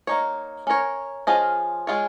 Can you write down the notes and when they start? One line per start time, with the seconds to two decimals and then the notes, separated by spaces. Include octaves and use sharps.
0.07 A#3 D#4 C#5
0.67 C#4 A#4 C#5
1.27 F3 C#4 F4 G#4 D#5
1.87 G#3 F4 G#4 C#5